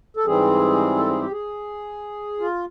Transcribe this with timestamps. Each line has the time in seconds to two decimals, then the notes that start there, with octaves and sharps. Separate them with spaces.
0.17 A4
0.26 G#2 E3 G3 C4 G#4
0.97 A4
1.09 G#4
1.21 G4
1.31 G#4
2.40 F4